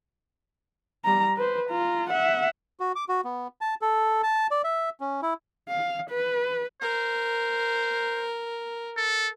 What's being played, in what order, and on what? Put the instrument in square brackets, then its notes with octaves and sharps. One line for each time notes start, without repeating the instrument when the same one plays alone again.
[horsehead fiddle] G3 A#5
B4 C5
F4 A#5
E5 F#5
[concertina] F#4
D6
F#4
B3
A5
A4
A5
D5
E5
C#4
E4
[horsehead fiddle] F5
B4
[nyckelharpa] A#4 [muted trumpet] C5
[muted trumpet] A4